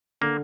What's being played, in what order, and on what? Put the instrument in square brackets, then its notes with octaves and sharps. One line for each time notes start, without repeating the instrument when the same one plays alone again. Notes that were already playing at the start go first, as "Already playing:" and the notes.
[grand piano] D3 [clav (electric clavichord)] A#3